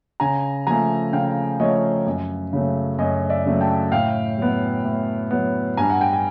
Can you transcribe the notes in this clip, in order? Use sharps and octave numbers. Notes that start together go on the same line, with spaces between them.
C#3 G#5 A#5
F3 A3 G#5 A#5
C#3 F5 G5
F3 A3 C#5 D#5
F#2
C#3 F#3 A3
F#2 C#5 D#5
D5 E5
C#3 F#3 A3
G5 A5
A2 F5 G5
F#3 B3
A2
F#3 B3
G2 G#5 A#5
F#5
G5
G#5